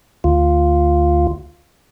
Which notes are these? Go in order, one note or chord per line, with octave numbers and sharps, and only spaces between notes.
D2 F4